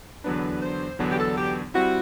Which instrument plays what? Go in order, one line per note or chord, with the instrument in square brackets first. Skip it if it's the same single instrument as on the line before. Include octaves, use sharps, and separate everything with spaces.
[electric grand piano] E2 D3 F#3 B3 D4 [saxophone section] B4
[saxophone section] C5
[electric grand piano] E2 D3 F#3 B3 D4
[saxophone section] G4
A4
G4
[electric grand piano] G3 C4 E4 [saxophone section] F#4